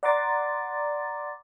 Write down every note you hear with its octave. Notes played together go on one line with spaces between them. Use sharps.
D5 F#5 A#5 C6 D6 A6